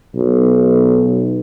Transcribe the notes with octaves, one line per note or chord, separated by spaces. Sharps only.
B1